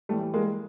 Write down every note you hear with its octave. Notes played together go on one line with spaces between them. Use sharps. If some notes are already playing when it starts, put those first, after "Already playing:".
A2 E3 G3 A3
G#3 A#3